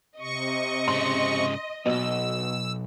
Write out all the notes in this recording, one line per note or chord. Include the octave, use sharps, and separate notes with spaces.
C3 D#5 C#6
G#2 C#3 C6
B1 B2 E6